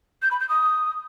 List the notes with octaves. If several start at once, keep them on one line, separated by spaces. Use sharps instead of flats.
G6
B5
G6
D#6